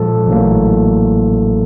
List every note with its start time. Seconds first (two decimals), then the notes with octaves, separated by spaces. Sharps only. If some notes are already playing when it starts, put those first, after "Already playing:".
Already playing: A#2 F3 G#3 A4
0.27 A1 A2 F#3 A#3